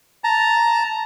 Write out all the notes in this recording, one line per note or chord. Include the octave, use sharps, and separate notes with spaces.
A5 A#5